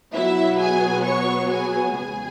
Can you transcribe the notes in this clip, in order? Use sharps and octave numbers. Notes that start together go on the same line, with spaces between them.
B2 F#3 B3 E4 E5
G#4 G#5
C#5 C#6
G#4 G#5
E2 C#3 E3 G#3 B3 G#4 G#5